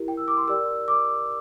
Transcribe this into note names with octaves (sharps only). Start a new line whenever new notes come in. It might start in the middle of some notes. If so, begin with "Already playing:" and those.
Already playing: E4 G4 A#4
G5
E6
D6
C6
G4 A#4 D5 E6
D6